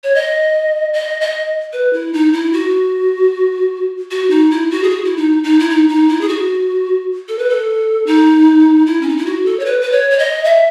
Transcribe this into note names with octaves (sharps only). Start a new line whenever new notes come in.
C#5
D#5
D#5
D#5
B4
E4
D#4
E4
F#4
F#4
D#4
E4
F#4
G#4
F#4
E4
D#4
D#4
E4
D#4
D#4
E4
G#4
F#4
A4
B4
A4
D#4
E4
C#4
D#4
E4
F#4
A4
C#5
B4
B4
C#5
C#5
D#5
E5